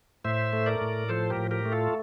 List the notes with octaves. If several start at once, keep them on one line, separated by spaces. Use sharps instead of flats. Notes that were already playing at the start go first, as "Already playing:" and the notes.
A2 C5 E5
A3
A#4 D5
A2
F3 A4 C5
G4 A#4
A2
G4 A#4
A3
F4 A4